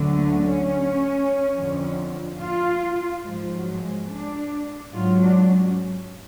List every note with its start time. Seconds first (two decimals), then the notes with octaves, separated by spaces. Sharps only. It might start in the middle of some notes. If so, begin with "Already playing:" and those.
Already playing: D2 D3 F#3
0.14 A3
0.41 C#4
1.54 F2 D3 F3
2.39 F4
3.23 G#2 F3 G#3
3.53 F#3
3.81 G#3
4.09 D4
4.93 G#2 F#3 F4
5.22 D4
5.49 C#4